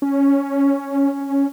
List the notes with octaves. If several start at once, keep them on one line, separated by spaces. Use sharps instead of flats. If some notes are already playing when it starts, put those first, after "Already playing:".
C#4